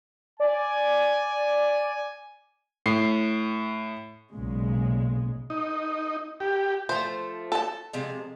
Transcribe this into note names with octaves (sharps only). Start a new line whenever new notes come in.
D5 G#5
A2 C7
B1 A#2 C#3 G#3
D#4
G4
F3 A3 C5
A4 A5
C3 F3 G#3